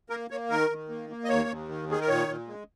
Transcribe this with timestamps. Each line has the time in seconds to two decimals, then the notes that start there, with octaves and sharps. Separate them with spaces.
0.09 A#3 A#4
0.30 A#3 C#5
0.50 D#3 A#4
0.70 D#3
0.89 A#3
1.10 A#3
1.24 D#5
1.29 D#2 C#5
1.48 D#2
1.68 D#3
1.89 D#3 G#4
2.01 A#4
2.08 A#2 C#5
2.28 A#2
2.48 G#3